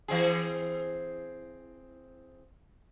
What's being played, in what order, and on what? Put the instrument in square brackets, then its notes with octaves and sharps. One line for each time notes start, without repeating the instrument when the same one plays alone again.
[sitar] E3 C4 G#4